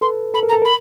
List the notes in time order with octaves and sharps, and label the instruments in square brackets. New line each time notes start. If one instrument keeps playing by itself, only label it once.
[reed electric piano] A4 B4 [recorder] C6
[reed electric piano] A4 [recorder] B5
[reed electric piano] A#4
[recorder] A#5
[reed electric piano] A4
[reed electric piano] A#4 [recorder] B5